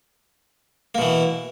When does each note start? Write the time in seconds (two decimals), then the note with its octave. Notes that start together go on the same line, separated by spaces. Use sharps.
0.95 A#3
0.98 B2
1.02 E3